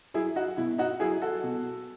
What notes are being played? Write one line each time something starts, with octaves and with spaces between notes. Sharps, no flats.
F#3 E4 G#4
D#4 F#4
B2 E4
D#4 F#4
F#3 E4 G#4
F#4 A4
B2